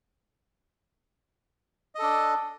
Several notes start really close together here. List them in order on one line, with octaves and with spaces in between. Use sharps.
D#5 A4 D4